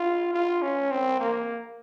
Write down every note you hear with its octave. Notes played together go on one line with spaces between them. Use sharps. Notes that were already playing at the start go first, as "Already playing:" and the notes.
Already playing: F4
F4
C#4
C4
A#3